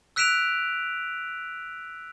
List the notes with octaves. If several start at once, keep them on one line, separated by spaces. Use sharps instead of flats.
E6 F#6 B6 D7 E7 F7